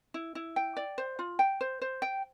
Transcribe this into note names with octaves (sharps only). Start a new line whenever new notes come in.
E4
E4
G5
D5
C5
F4
G5
C5
C5
G5